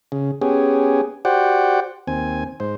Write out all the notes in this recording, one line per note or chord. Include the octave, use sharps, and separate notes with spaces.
C#3
B3 C#4 G4 G#4
F#4 G4 C5 D5 F#5 G5
D#2 C4 G#5
G#2 C5